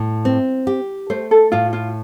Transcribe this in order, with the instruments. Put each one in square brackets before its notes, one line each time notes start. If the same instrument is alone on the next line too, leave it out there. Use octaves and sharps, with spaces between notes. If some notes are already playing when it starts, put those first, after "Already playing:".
Already playing: [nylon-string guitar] A2
C4
G4
[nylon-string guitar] A3 [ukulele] C5
[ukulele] A4
[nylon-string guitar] A2 [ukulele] F4
[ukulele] F4